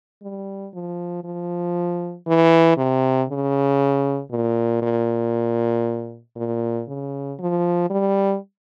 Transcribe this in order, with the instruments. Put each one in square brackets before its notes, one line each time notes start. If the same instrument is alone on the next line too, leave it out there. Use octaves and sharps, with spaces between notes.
[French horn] G3
F3
F3
E3
C3
C#3
A#2
A#2
A#2
C#3
F3
G3